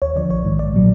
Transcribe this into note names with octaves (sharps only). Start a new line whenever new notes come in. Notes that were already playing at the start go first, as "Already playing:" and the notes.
D#2 C#5
D3 F3 D5
A#1 C#5
G#2 D#3
A#1 D5
A#2 F#3